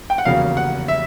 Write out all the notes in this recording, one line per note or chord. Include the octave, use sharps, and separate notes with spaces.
G5
F#5
F1 E2 C#3 F#3 A#3 F5
F#5
E5